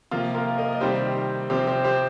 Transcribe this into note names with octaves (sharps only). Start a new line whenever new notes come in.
C3 F3 A#3 F4
F4 A#4
A#4 D#5
D#5
C3 D#3 G3 C4 G4 C5
C3 F3 C4 G4 C5
G4 C5
G4 C5